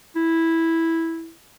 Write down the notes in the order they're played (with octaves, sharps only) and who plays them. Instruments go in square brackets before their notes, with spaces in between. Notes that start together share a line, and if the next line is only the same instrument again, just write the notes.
[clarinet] E4